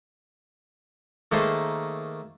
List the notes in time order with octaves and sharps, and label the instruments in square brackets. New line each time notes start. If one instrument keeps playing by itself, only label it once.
[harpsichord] D#3 A3 A#3 G#4 A4 C5